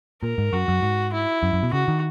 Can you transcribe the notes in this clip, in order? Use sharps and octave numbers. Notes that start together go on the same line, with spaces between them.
A#2 A#4
G#2
F#2 F#4
F#2
G#2
E4
F#2
F#2
B2
C#3 F#4
D#3